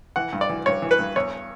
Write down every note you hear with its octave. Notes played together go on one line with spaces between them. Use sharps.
E3 F#5
G2
D5
E3
G2 C#5
E3
B4
G2
E2 C#5